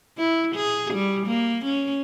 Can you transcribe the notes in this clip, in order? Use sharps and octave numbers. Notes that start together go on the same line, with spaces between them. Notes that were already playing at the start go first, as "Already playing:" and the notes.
E4
G#4
G3
A#3
C#4